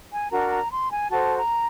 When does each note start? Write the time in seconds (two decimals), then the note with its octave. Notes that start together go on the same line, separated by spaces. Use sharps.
0.11 G#5
0.31 D4 F#4 A#4 A#5
0.51 A#5
0.71 C6
0.91 G#5
1.10 F#4 A4 C5 A5
1.37 A#5